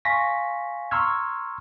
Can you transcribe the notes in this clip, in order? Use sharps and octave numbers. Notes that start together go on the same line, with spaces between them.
F5 G#5 C6 C#6 A#6 B6
A#5 C6 C#6 E6 F6 G#6